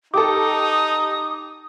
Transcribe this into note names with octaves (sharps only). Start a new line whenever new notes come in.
D#4 G4 A4 D6 D#6